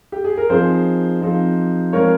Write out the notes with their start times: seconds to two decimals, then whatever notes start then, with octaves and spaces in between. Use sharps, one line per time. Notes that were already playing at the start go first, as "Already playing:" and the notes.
0.12 G4
0.25 G#4
0.37 A#4
0.50 F3 C4 D#4 G#4 C5
1.22 F3 C4 D#4
1.93 F3 G#3 C4 A#4 C#5